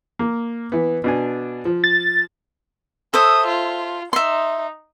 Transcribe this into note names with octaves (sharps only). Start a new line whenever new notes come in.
A#3
E3 B3
B2 D4 G#5
F3
A6
A4 C5 E5 D#6
F4
D#4 E5 C6